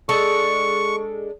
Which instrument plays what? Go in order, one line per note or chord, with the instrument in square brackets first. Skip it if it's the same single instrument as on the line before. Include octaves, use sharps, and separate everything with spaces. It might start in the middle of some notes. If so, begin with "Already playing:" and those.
[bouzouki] G#3 D4 A4 [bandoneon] C#6